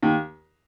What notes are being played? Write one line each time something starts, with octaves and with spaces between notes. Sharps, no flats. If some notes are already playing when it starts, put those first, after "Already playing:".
D#2